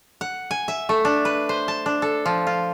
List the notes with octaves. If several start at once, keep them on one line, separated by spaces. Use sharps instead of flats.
F#5
G#5
E5
A3
D4
B4
C5
A5
D4
A4
F3
F4